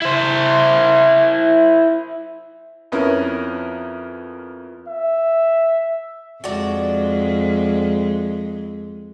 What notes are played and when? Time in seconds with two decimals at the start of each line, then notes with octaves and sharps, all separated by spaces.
0.02 E4 C5
2.92 F2 B3 C#4 E4 A#4
4.88 E5
6.44 F2 G#3 F#4 D5